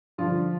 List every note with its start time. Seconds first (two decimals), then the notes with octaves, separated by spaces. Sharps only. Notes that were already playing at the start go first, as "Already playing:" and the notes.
0.18 G2 D3 F3 F4